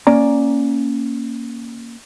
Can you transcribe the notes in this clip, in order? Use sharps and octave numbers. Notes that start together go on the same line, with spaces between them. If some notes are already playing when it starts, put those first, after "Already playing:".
A#3 C#4 D5 A#5